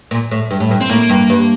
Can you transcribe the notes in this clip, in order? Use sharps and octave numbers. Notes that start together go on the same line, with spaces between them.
A#2
A2
G2
A2
G2
C4
A2 A#3
G2
G2